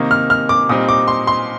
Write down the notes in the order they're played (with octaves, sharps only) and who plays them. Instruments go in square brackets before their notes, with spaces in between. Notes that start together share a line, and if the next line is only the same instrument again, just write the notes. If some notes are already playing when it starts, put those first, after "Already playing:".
Already playing: [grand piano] C3 D#3 A#3 D#4
F6
F6
D6
A#2 G3 C4 D#4 D#6
D6
C6
C6